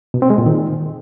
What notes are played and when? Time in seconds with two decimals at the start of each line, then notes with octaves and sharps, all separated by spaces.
0.14 B2
0.22 C4
0.30 G#3
0.38 A#2
0.46 D#3